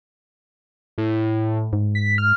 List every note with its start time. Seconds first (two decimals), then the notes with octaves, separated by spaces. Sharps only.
0.98 A2
1.73 G#2
1.95 B6
2.18 F6